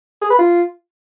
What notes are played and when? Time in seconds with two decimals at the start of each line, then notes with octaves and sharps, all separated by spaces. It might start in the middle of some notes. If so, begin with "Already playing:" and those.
0.22 G#4
0.30 B4
0.39 F4